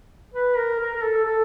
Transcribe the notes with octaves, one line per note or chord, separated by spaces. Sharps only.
B4
A#4
A#4
A#4
A4
A4